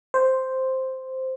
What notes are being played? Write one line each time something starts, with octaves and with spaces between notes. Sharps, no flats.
C5